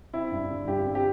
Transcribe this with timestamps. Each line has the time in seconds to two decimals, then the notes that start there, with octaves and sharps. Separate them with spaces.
0.13 C4 E4
0.32 G2
0.50 D3
0.67 G2 G4
0.85 C4
0.95 G4